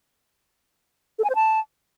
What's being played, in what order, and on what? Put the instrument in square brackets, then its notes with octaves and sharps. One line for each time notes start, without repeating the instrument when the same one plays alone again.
[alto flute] A4
G#5
C5
A5